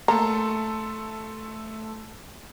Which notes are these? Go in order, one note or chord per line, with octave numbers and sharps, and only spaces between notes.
A3 A#3 A4 A#5 C6